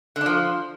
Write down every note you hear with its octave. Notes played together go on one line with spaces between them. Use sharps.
D3
D4
F3